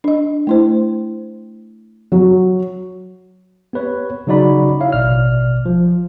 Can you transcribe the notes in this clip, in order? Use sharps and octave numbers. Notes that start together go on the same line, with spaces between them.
D4 D#5
A3 E4 C5
F#3
B3 G4 B4 C#5
C#3 F#3 D#4 F#4 D5 B5
E4 C#5 E5 F5
A1 B2 D5 F6
F3